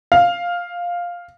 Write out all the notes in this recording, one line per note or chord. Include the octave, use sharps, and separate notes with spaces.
F5